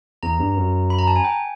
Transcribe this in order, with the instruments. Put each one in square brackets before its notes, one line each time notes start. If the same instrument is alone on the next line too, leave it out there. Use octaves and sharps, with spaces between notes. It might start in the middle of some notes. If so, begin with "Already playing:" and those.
[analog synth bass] E2 [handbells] A#5
[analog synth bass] G2
F#2
[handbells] B5
A#5
A5
G#5
G5